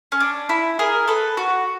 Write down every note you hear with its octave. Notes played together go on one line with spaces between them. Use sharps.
C#4
D4
E4
G#4 A#4
A4 B4
F#4